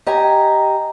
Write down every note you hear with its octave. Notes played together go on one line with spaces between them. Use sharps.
G4 D#5 G#5 A#5